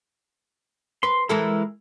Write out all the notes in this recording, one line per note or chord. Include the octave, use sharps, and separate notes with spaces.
B4 C6
E3 G#3 E4 A4 A#4